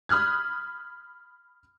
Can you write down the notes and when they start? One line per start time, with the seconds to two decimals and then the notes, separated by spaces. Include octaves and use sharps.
0.09 B5 D#6 F6 F#6 G#6